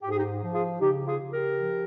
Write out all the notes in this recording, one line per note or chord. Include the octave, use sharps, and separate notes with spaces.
G#2 G4
G#4
D#4 G4
F3
F4 G#4
C#3 D#4 G4
F4 G#4
C#3
G4 A#4
F3